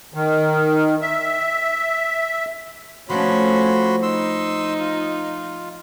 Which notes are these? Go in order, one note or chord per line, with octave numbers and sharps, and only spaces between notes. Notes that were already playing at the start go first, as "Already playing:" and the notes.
D#3
E5
F3 A3 C#4 D4 F#4 B5 C6
D#4 C6 E6
F4